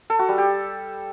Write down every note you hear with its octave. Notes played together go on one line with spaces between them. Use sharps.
A4
F#4
G3
G4